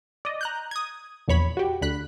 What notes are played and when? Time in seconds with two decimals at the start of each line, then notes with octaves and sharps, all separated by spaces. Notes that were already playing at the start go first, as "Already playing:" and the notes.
0.25 D5 D#5
0.41 A#5 F#6 G6
0.71 D#6 G#6
1.28 A#1 E2 C#5 B5
1.57 F#4 G4
1.81 D2 D3 B5 F#6